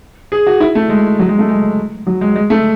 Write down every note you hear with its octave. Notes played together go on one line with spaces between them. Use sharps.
G#4
F#4
E4
A3
G#3
F#3
G#3
A3
G#3
F#3
G#3
G#3
A3